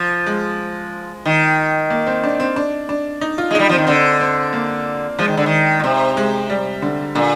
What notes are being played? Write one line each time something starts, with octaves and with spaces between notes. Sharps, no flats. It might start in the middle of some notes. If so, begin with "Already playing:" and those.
Already playing: F3
G#3
D#3
A#3
C4
D4
C4
D4
D4
D#4
F4
G#3
D#4
G3
F3 C4
D#3
D3 C4
C4
A#3
F3 G#3
D#3
D3
D#3
A#2
C3 C4
G#3
G3
D3
A#2 D3